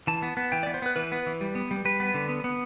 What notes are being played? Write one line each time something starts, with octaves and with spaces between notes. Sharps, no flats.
E3 A5
B3
B3
E3 G5
B3 D5
C5
B3 B4
E3 B4
B3
E3
G3
B3
G3
G3 B4
B3
D3
B3
B3